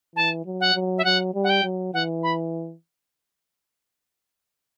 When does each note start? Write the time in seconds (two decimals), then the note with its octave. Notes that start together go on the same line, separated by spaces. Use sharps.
0.15 E3 A5
0.45 F#3
0.60 F#5
0.75 F#3
0.98 E5
1.04 F#3 F#5
1.34 G3
1.43 F#5
1.49 G5
1.64 F#3
1.93 E3 F#5
2.23 B5